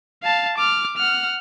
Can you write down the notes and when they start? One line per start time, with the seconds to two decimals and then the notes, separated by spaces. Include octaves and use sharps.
0.23 F5 A5
0.58 D6 F6
0.97 F#5 F6